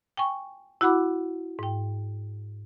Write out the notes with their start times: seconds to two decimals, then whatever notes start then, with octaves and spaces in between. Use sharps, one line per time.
0.17 G5 G#5 C#6
0.81 E4 F#4 F#5 B5 D6
1.59 G#2 G5